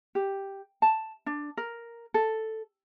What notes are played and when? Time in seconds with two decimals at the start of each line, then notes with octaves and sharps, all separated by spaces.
0.15 G4
0.82 A5
1.26 D4
1.57 A#4
2.14 A4